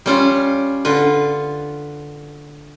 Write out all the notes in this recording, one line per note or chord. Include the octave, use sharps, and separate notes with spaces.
G3 C#4 F4
D3 F4 B4